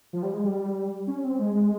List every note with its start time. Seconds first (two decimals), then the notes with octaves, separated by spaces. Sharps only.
0.13 F3
0.23 G3
0.34 G#3
0.44 G3
1.07 C#4
1.24 C4
1.39 G#3